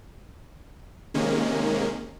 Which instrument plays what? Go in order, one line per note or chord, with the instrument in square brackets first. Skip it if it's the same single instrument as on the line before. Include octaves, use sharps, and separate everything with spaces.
[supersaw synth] C3 D#3 G#3 A#3 C#4